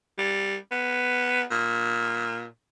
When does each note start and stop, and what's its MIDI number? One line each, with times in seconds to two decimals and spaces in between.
0.18 0.56 55
0.71 1.43 59
1.51 2.45 46